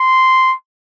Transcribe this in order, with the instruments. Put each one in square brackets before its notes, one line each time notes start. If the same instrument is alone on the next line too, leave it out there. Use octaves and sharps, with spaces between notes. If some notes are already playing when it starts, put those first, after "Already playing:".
Already playing: [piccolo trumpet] C6